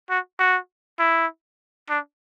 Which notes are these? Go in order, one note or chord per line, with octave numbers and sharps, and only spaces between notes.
F#4
F#4
E4
D4